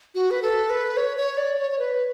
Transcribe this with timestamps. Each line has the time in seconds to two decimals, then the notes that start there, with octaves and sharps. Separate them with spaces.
0.15 F#4
0.31 B4
0.42 A4
0.70 B4
0.97 C#5
1.17 C#5
1.38 D5
1.58 C#5
1.71 C#5
1.79 B4